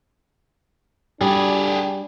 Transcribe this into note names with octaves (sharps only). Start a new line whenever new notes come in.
G3 D4 G4 G#4